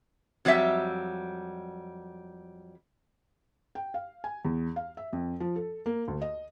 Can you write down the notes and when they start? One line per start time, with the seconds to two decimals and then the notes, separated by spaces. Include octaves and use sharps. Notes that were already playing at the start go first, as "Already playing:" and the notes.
0.45 F2 F#3 G3 B3 E5 G5
3.75 G5
3.94 F5
4.24 G#5
4.45 E2
4.76 F5
4.97 E5
5.13 F2
5.40 F3
5.56 A4
5.86 A#3
6.08 D2
6.22 D#5